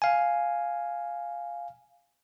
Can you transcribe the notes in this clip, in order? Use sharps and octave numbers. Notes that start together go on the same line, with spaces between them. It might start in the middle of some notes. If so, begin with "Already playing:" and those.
F5 G#5